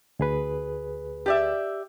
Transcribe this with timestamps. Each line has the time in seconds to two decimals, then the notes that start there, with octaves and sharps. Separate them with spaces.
0.19 D2 G#4 B4
1.26 G4 D5 E5